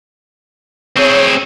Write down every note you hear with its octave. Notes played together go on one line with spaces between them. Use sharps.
C4 G#4 C#5